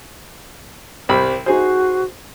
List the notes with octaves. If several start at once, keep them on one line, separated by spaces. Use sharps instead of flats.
C2 G3 C5 B5
D#4 F#4 G#4 C5